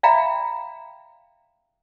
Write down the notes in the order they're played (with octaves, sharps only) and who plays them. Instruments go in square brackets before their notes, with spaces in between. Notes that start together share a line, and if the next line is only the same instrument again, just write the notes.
[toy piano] D5 E5 F5 G5 A#5 B5